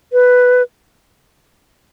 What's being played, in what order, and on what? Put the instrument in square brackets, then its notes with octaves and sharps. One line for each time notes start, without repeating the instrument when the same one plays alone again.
[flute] B4